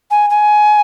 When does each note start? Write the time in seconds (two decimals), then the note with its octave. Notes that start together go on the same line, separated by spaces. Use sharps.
0.11 G#5
0.30 G#5